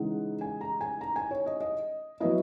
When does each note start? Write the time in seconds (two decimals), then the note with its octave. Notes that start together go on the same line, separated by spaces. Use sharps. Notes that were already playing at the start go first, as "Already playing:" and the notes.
Already playing: C#3 E3 G#3 D#4 F#5
0.41 G#5
0.61 A#5
0.81 G#5
1.01 A#5
1.16 G#5
1.31 C#5
1.46 D#5
1.61 D#5
2.20 F#3 B3 E4 D#5